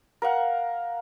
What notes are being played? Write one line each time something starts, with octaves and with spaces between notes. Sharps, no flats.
A#4 F5 F#5